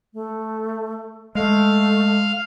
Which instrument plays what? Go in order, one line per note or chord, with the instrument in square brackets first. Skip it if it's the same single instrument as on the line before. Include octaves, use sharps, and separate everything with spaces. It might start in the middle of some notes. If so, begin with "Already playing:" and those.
[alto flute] A3
[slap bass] G#3 [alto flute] A3 [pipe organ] F5